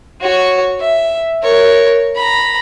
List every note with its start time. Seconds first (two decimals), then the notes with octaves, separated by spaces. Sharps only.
0.21 F#4 C#5
0.80 E5
1.42 A#4 C#5
2.16 A#5 B5